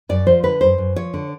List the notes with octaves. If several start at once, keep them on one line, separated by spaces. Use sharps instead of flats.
F#2 D5
F3 C5
D3 B4
F#2 C5
F#2
F3 C#5
D3